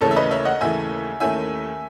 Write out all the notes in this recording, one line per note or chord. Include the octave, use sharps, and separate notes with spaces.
D#2 C#3 E3 A3 A4 C#5
E5
B4 D#5
C#5 E5
D#5 F#5
D#2 C#3 E3 A3 E5 G#5
D#2 D#3 A3 C#4 E4 E5 G#5